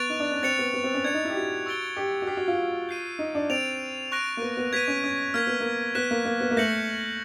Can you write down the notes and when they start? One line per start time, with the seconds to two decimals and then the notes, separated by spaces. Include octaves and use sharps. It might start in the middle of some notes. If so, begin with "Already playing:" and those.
Already playing: B3 C#6 F#6 A6 D7 F7
0.10 D#4
0.20 D4
0.31 C#4
0.43 C4 A6 C#7 F7
0.59 B3
0.74 B3
0.84 C4
0.94 C#4
1.04 D4 G#6 C#7 F7
1.14 D#4
1.25 E4
1.30 G4
1.35 F#4
1.66 C#6 E6 A6 D7 G7
1.96 G4
2.22 F#4
2.27 G4 F6 A6 C7
2.37 F#4
2.48 F4
2.89 G6 C7 D#7
3.19 D#4
3.35 D4
3.50 C4 A6 D7 F7
4.12 C#6 F#6 A#6 D7
4.37 A#3
4.42 B3
4.57 B3
4.73 B3 G#6 B6 D#7
4.88 C#4
5.04 C#4
5.34 A#3 F6 G#6 B6
5.47 B3
5.60 A#3
5.95 B3 F#6 B6 E7
6.11 A#3
6.25 A#3
6.41 B3
6.51 A#3
6.57 A3 G6 A#6 C#7 F#7